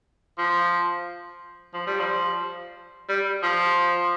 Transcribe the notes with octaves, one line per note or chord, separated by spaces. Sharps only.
F3
F3
G3
F3
G3
F3